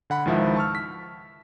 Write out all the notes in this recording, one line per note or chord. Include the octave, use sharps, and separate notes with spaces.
D3 F#5 B5
C#2 G#2 D#3 F3 E4 E5
A5 C#6 E6 F6
B6